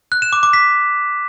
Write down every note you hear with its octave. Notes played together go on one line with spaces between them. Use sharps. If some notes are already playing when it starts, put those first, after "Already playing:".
F#6
E7
D6
D6
B6